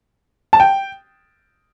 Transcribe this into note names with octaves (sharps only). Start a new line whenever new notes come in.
A5
G5